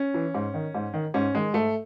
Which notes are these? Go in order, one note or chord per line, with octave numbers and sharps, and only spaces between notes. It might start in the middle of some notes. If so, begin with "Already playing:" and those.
Already playing: C#4
E3
G#2
D#3
G#2
D#3
G#2 C#4
D#3 G#3
G#2 A3